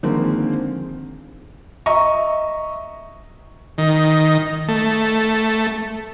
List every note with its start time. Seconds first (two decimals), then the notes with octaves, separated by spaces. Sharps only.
0.03 D3 D#3 F3 G#3 A#3 C4
1.86 D#5 E5 A#5 C#6
3.78 D#3
4.68 A3